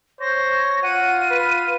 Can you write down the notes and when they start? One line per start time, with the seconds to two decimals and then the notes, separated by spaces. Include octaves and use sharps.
0.21 C5 C#5 A#6
0.83 F4 F#5 D#7
1.31 B4